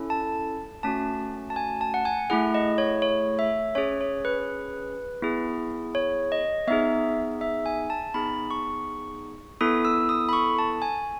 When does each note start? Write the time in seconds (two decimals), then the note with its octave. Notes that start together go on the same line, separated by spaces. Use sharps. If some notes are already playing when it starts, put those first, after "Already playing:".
Already playing: C#4 E4 A4
0.10 A5
0.83 A3 C#4 F#4 A5
1.50 A5
1.56 G#5
1.81 A5
1.94 F#5
2.05 G#5
2.30 A3 E4 G#4 F#5
2.54 D#5
2.78 C#5
3.02 C#5
3.39 E5
3.75 C#4 G#4 C#5
4.01 C#5
4.25 B4
5.22 B3 E4 G#4
5.95 C#5
6.32 D#5
6.67 B3 D#4 G#4 E5
7.41 E5
7.66 G#5
7.90 A5
8.14 B3 D#4 G#4 B5
8.51 C#6
9.61 B3 E4 A4 D#6
9.85 E6
10.09 D#6
10.29 B5
10.33 C#6
10.59 A5
10.82 G#5